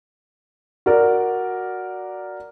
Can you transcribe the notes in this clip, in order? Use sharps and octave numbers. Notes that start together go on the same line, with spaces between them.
F#4 A#4 D5